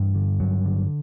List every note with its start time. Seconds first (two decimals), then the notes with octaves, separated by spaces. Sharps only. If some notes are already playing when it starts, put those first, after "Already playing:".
Already playing: G2 E3
0.15 D3
0.40 G2 F#3
0.65 D3